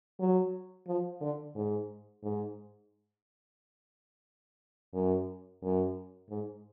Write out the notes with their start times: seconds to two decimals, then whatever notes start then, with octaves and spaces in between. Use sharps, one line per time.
0.20 F#3
0.87 F3
1.21 D3
1.55 G#2
2.23 G#2
4.93 F#2
5.62 F#2
6.29 G#2